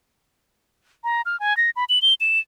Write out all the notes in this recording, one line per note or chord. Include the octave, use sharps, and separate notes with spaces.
A#5
F6
G#5
A#6
B5
F#7
G7
E7